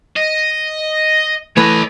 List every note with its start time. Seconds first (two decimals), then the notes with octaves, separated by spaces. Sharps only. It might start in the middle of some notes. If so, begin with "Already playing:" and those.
0.17 D#5
1.57 E3 A3 B4 C#5 D#5